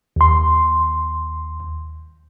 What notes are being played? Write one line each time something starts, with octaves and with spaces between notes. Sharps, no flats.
D#2 C6